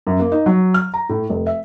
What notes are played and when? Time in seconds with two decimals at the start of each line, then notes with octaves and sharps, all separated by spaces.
0.07 F#2
0.19 A#3
0.32 D#4
0.46 F#3
0.74 F6
0.94 A#5
1.09 A2
1.30 F1
1.47 E5